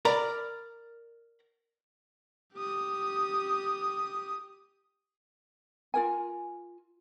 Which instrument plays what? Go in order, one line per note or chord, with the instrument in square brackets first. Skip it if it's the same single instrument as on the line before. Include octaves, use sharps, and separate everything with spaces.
[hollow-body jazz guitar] A#4 D5 A#5 B5
[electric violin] G4 D#6
[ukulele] F4 A#4 G#5